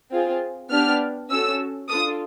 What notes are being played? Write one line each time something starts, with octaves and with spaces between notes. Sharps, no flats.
C4 F4 G#4
B3 D4 G4 F6
C#4 F#4 A4 E6
D4 F4 A4 D#6